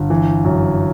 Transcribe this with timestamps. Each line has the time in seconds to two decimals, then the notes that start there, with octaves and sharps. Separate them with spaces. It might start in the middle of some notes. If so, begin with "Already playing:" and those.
Already playing: G1
0.10 E3
0.44 F#2